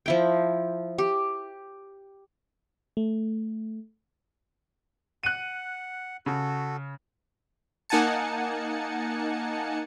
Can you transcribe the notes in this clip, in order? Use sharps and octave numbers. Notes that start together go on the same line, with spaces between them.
F3 E4 G5
G4
A3
F#5 F#6 D#7
C#3 F#4 A4
A#3 D#4 F#5 G#5 A5 C#7